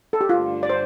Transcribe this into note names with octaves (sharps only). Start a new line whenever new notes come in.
A4
G4
G2 D3 A3 D4 F4
D5
C5